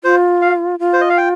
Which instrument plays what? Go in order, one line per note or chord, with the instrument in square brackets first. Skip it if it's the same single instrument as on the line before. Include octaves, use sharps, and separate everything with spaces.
[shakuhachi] F4 [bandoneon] C5
[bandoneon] F5
[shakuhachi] F4
[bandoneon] C5
D#5
F5
G5